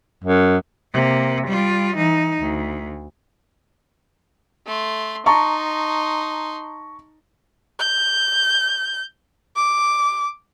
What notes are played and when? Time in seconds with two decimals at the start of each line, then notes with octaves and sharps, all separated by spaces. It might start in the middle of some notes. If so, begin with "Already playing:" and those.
0.24 F#2
0.93 C3 A#3
1.48 G3 F4
1.97 E3 D#4
2.42 D2
4.67 A3 C6
5.26 D#4 A5 A#5 C6 C#6
7.80 G6
9.56 D6